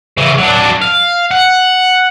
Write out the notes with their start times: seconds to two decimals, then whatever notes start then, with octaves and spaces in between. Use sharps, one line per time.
0.18 C#3 E3
0.38 F#3 D4
0.82 F5
1.31 F#5